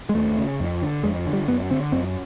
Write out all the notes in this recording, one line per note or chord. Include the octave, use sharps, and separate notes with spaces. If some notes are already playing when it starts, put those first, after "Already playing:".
G#3
D#2 A3
C#3
F2
D3
F2 G#3
D3
G3
F#2 B3
D3 C4
F#2 C4